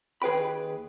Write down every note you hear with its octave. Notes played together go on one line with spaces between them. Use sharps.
D#2 G#4 B4 G5 B5